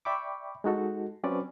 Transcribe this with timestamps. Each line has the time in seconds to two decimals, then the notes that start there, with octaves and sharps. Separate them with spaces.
0.05 D5 E5 G5 B5 C#6 D6
0.64 G#3 D#4 F#4 A4
1.23 F#3 C4 C#4 B4 D5